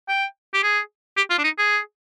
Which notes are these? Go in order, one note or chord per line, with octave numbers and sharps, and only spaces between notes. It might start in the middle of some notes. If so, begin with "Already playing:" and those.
G5
G4
G#4
G4
F4
D4
D#4
G#4